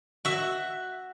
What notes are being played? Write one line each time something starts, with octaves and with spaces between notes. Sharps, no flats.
F#4 E5